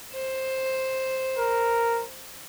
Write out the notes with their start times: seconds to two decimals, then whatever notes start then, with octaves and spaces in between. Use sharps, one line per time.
0.13 C5
1.38 A#4